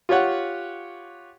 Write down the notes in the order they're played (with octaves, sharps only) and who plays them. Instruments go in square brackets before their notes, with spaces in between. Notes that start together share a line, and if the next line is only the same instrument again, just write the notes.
[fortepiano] F4 G4 C#5 F#5